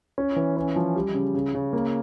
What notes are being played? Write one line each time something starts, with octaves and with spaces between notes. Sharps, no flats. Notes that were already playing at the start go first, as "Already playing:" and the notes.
C#4
E3
C#4
F3
G3
C#3
C#3
C#3
A#3